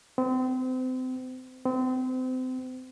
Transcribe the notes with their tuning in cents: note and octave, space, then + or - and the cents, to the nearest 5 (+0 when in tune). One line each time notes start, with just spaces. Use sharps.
C4 -30
C4 -30